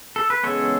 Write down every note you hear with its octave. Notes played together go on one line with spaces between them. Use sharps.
A4
B4
C#3 E3 G#3 B3 A4 C#5